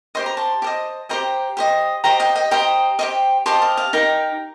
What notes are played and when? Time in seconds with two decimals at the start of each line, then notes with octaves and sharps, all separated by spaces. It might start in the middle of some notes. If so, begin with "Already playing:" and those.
0.15 G4 C5 D#5 C6
0.26 A#5
0.37 A5 C6
0.62 G4 C5 D#5
1.09 G4 C5 D#5 G5 A#5
1.57 G4 C5 D#5
2.04 G4 C5 D#5 G5 A#5
2.20 D#5 G5
2.35 D#5 G5
2.51 G4 C5 D#5 G5 A#5
2.99 G4 C5 D#5
3.46 G4 C5 D#5 A5 C6
3.62 F5 A5
3.77 F5 A5
3.93 D#4 G4 A#4 G5 A#5